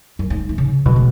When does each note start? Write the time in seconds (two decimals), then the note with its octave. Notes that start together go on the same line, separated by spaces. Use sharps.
0.19 F#2
0.30 G#2
0.49 E3
0.58 C#3
0.86 B2 F#3
0.96 G#3